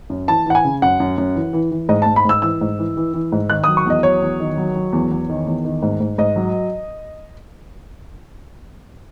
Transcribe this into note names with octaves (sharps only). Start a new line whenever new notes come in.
F#2
E3 A5
E3 F#5
G#5
C#3
F#2 F#5
F#2
F#2
E3
E3
E3
G#2 D#5
G#2 A5
B5
G#2 E6
E3 E6
G#2
E3
E3
E3
G#2
D#3 F#6
F#3 D#6
C#6
E2 D#5
F#3 C#5
E2
D#3
F#3
F#3
E2
E2
D#3
E2
D#3
G#2
G#2
G#2 D#5
F#3